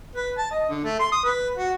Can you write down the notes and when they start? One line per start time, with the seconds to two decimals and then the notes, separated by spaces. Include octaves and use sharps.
0.16 B4
0.38 A5
0.51 D#5
0.69 D3
0.84 A3
0.99 C6
1.12 D#6
1.24 B4
1.57 F#4